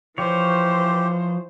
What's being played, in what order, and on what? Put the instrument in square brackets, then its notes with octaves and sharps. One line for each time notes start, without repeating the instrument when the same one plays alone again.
[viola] E3 C5 [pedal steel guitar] F3 C#5 [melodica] G4